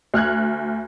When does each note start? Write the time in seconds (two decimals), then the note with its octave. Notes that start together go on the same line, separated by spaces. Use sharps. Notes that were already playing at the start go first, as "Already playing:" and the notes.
0.14 D2 F6 F#6 G#6